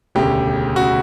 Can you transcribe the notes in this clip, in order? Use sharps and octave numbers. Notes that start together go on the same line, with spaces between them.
E1 D2 C#3 G4
C#3 F#4